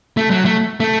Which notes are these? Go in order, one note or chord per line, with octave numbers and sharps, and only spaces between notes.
A3
F#3
A3
A3